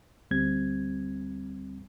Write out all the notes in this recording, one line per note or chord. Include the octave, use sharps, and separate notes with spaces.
D2 G3 C4 G#6